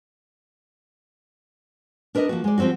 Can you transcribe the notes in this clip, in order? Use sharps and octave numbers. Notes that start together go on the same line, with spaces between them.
D4 A#4 B4 D5 D#5
F3 A#3 F#4
G#3 D5
F3 G3 C4 C#4 F#4